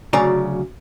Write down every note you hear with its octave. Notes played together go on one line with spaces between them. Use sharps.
D2 C#3 F#3 D5 G#5 A#5